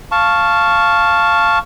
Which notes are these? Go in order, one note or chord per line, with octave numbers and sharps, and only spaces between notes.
F5 A5 C#6